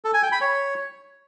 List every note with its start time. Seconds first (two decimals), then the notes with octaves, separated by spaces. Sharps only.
0.05 A4
0.14 G#5
0.23 G5
0.32 B5
0.41 C#5